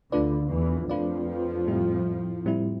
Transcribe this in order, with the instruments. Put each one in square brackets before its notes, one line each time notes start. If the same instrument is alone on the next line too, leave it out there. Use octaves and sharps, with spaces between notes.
[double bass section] D2 D3 [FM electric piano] A3 D4 F4 B4 D5
[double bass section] E2 E3
[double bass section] F2 F3 [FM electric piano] A3 D4 F4 B4 D5
[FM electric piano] A2 G3 C4 E4
A2 G3 C4 E4